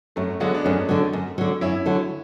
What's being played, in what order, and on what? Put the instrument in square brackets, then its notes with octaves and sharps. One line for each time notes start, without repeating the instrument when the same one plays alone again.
[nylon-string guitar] F#2 [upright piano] F#3 A3
[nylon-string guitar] D3 F#3 [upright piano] G#3 B3
[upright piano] D4
[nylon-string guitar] F#2 [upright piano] A3 C#4
[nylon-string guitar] D3 F#3
F#2
D3 F#3
[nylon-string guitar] F#2 [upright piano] C#4 E4
[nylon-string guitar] D3 F#3